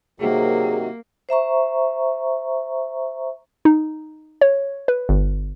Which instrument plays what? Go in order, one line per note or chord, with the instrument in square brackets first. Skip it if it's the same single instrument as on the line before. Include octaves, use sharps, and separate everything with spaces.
[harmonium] C3 D#3 F#3 [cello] A#3 [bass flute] G#4
[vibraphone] C5 E5 A#5 C#6
[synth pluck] D#4
C#5
B4
G1